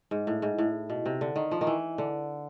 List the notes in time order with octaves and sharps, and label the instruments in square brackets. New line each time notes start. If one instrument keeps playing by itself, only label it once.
[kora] G#2
A2
G#2
A2
B2
C3
D3
D#3
F3
D#3
E3
D3